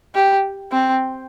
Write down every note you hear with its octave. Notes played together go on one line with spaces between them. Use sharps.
G4
C4